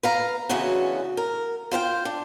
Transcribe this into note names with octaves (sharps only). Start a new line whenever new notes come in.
B4 F5 A#5
D2 C#3 E3 B3 C#4 F#4
A#4
F4 C5 F5 G5
D4